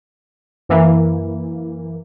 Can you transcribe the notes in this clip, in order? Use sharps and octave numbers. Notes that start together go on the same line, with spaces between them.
F#2 E3 A#3